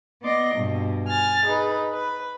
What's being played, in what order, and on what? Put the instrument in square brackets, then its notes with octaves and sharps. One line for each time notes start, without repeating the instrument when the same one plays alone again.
[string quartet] B3 D5 D#5 C6 A#6
G2 B2
G#5 F6 A6
D#4 G#4 B4
B4